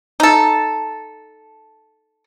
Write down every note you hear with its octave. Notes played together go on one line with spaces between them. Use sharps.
D#4 A4